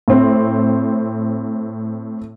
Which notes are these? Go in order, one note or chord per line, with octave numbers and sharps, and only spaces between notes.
A2 C4